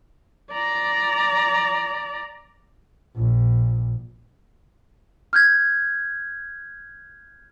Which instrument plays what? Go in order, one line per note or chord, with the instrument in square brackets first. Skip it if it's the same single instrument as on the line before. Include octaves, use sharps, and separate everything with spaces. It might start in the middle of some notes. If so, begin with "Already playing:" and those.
[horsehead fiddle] D5 A#5
[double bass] A#1
[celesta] F6 G6 G#6